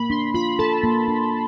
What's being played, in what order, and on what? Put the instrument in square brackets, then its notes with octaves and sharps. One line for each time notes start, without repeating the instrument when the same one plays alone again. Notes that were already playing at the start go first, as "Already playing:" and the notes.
Already playing: [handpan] A#3 [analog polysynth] B5
[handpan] D4 [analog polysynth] C6
[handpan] F4 [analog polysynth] B5
[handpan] A4 [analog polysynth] A5
[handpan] A#3
D4